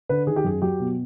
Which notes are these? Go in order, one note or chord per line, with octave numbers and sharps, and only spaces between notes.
D3 B4
D#3 G#4
G4
F#2 G#4
F#3 G4
B2